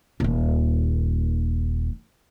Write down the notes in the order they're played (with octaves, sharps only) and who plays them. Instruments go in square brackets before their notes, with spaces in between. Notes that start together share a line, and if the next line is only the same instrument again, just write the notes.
[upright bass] D#1 D#2